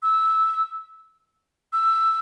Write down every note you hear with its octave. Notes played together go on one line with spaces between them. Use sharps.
E6
E6